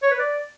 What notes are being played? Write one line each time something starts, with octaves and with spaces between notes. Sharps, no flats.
C#5
B4
D5